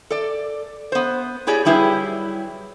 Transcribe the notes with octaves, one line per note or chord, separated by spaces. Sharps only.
A4 D5
B3 C5
E4 G4 G#4 C#5 D5
F#3 G3 E4 G4 G#4 B4